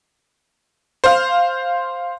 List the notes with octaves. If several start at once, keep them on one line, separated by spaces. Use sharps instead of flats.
C5 F5